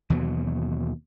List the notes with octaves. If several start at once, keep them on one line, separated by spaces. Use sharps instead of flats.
D#2 B2 E3 F#3